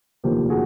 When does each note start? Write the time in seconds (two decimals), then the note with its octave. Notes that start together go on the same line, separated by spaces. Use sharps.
0.24 F1 D#2 D3 F3 A#3 G4
0.50 F#4 G#4